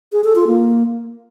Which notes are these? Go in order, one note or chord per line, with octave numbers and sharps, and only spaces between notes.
G#4
A4
F4
A#3